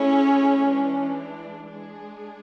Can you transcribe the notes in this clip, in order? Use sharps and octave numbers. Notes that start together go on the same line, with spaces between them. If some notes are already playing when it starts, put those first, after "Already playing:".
Already playing: A3 C#4 E4 G#4 C#5
E3 G#3 D4
G#3 D4 G#4